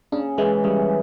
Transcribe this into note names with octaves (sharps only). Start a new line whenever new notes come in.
C#3 D4
E3 G#3
C#3 G3